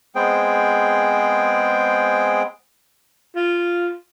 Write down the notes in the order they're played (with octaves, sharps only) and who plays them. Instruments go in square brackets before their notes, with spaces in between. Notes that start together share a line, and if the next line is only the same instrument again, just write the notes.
[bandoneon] G#3 B3 C4 G#4 C5 G5
[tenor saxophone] F4